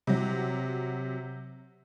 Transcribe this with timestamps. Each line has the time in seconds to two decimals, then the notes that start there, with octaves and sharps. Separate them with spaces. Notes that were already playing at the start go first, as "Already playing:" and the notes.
0.07 C3 F#3